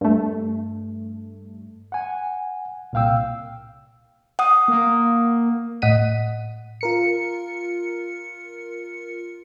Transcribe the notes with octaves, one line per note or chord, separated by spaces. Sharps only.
G2 A3
F#5 G#5
C2 A#2 F5 G5 E6
F#5 D#6
A#3
A2 D#5 F#5 B6 D#7
F4 A#4 C#7